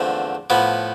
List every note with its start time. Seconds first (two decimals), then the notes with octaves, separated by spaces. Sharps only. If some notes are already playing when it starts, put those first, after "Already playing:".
Already playing: E2 D3 F3 A3 C4
0.50 A2 F3 B3